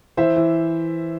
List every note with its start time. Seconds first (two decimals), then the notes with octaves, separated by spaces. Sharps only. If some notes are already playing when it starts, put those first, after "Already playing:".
0.17 E3 C5 E5
0.36 E3